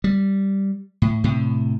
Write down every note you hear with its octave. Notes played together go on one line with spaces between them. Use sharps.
G3
A2
A2 C3